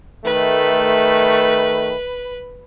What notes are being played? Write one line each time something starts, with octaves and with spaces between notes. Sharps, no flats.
D#3 A3 B4